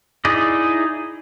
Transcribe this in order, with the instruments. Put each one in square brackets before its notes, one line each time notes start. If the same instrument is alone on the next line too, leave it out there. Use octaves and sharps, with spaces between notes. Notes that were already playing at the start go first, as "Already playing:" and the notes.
[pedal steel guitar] D#4 E4 G#4 D5 D#5